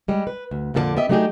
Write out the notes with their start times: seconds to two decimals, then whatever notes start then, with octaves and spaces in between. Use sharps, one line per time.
0.08 G3 G#3
0.27 B4
0.51 D2
0.74 F2 A#2 D3 A4 D5 A5
0.97 B3 G4 D#5 E5
1.09 F#3 A3 D4 D#4 G4 G#4